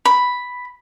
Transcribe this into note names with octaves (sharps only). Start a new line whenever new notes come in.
B5